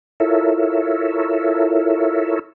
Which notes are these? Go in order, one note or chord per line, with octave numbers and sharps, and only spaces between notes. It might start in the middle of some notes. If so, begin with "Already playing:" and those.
E4 F4 A4 A#4 C#5 E5